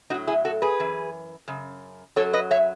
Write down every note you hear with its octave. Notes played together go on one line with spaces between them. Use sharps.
A2 F#3 D#4 F#4
E4 G#4
F#4 A4
G#4 B4
F#2 E3
F#2 C#3
F#2 D#3 F#3 A4 C#5
B4 D#5
C#5 E5